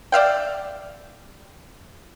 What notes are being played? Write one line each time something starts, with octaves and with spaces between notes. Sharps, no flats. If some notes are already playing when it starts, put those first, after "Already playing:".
D5 E5 F5 G5